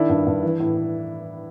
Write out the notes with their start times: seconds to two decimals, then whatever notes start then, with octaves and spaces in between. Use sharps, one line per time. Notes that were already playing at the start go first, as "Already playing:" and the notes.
Already playing: D#3 D4 E4
0.09 G2
0.26 G2
0.42 E3
0.60 A2
0.77 A2